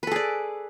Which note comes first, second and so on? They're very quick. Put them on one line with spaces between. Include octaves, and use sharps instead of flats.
B4 A4 G#4 D5